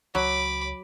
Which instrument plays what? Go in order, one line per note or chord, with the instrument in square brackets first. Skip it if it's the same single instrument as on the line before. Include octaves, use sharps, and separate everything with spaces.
[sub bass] C#2 [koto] F#3 [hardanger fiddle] B5 D6